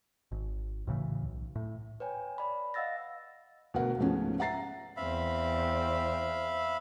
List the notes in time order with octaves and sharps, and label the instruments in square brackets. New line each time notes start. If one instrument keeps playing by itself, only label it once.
[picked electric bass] G#1
D2 A2 C#3 E3
B1
A2
[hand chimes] B4 C#5 G5 G#5
D5 B5
D#5 F5 F#5 E6 A6 A#6
[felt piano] D2 B2 A#4 F#5
C#2 G#2 F3 A3 B3 C#4
E5 F#5 A#5 A6 C7
[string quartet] E2 C4 [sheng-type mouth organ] E5 F5 B5